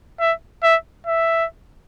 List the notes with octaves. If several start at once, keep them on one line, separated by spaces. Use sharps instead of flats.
E5
E5
E5